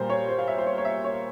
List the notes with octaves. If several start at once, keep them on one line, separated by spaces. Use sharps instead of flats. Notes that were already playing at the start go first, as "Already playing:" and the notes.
Already playing: A#2 G3 A#4 C5
C#5
C5
F5
E5
C5
C#5
C#5
E5
C#5